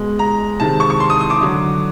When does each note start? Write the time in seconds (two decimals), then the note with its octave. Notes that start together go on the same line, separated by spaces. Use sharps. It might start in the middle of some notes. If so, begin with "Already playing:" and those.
Already playing: B2 G#3
0.19 A#5
0.60 C3 D#3 G#3 A5
0.80 C#6
0.90 C#6
1.00 C6
1.10 D#6
1.21 D#6
1.30 D6
1.41 D3 F#3